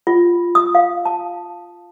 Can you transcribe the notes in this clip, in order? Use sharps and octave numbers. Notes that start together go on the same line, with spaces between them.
F4
D#6
F5
A5